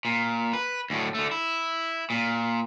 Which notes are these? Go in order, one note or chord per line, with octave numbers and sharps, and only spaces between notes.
A#2
B4
D2 A2
D3 A3
E4
A#2